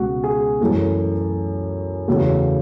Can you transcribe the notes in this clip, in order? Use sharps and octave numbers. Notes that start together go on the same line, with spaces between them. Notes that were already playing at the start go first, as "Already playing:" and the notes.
Already playing: C#2 B2 G#3 F#4
G#4
F#2 E3 A3 A4
E2 C#3 F#3 A3